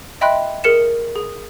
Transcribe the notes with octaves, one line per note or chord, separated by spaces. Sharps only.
D#5 E5 G5 B5 C6 F#6
G#4 A#4 C#7 E7
G#4